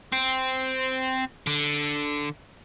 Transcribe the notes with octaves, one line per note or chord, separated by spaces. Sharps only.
C4
D3